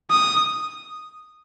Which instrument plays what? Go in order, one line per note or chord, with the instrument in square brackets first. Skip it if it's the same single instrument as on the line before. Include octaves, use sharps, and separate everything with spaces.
[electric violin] D#6